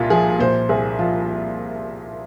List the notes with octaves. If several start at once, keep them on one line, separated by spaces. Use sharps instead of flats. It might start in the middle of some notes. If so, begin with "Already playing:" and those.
Already playing: C2 A#2 F4
F3 G#4
A#2 C5
C2 G#4
F3 F4